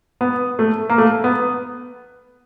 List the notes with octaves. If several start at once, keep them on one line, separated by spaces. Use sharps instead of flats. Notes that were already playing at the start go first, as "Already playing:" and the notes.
B3
A3
A#3
A3
B3